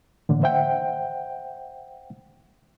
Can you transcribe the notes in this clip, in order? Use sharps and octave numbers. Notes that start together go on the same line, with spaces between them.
A2 D3 E3 A#3
C5 E5 F#5 G5